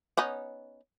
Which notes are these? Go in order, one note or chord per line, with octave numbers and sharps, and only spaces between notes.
B3 C#4 D#4